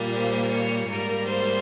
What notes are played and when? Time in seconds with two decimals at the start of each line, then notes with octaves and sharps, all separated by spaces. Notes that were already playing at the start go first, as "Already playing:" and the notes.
Already playing: A#2 G3 A#3
0.13 C5
0.50 C#5
0.87 G#2 G3 A#3 A#4
1.25 C5